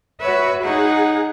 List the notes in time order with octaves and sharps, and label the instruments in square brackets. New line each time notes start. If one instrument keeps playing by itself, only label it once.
[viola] F#4 B4 [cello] C#5 E5
[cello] D#4 [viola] G#4 F#5